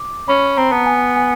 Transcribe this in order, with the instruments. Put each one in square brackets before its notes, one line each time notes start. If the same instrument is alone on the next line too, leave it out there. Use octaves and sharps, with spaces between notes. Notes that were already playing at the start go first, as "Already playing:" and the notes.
Already playing: [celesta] D6
[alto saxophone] C#4 [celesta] B5
[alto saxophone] C4 [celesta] A#5
[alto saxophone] B3 [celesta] A5
[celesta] G#5
G#5